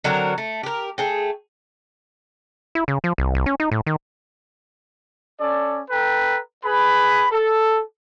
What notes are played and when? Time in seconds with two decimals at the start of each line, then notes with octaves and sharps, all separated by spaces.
0.04 D3 F#3 C4 A#4
0.38 A3
0.63 G4 A#4
0.98 A3 G#4 G5
2.75 E4
2.88 C#3
3.04 F3
3.18 C2
3.35 C2
3.46 C#4
3.60 D#4
3.71 A2
3.86 D#3
5.39 C#4 A4 D5
5.90 A4 B4 G5 A#5
6.63 G#4 B4 B5
7.31 A4